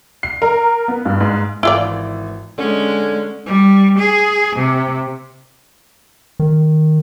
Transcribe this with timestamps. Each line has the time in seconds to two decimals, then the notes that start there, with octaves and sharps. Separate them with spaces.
0.23 C7
0.42 A#4
0.88 B3
1.05 G2
1.20 G#2
1.63 G#1 E3 E4 F4 D5
2.58 D3 G#3 C#4
3.47 G3
3.99 G#4
4.57 C3
6.39 D#3